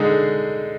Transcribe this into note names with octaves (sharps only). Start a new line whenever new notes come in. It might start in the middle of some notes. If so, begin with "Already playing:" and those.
Already playing: D3 G#3 D#4 G#4